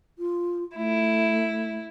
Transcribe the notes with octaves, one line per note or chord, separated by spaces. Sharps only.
F4
A3 E4